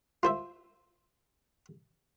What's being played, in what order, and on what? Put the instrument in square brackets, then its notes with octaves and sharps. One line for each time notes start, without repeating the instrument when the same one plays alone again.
[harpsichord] F4 C5 E5